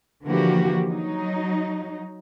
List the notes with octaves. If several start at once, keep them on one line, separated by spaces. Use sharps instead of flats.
D3 E3 F3 A#3 F#4 G4
F#3 D#4